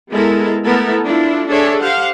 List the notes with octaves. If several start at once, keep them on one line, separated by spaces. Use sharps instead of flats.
G#3 B3 E4 A4 A#4
A3 B3 E4 A4 A#4
D4 E4 F4 A4
D4 G#4 A4 C#5 D5 E5
G4 C5 F5 F#5